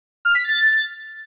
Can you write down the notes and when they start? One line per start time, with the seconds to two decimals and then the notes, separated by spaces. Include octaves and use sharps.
0.25 F6
0.35 B6
0.44 A6